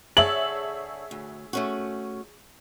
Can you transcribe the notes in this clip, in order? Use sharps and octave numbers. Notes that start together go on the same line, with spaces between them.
D3 G#4 C#5 E5 A5 F#7
D2
A3 C#4 F#4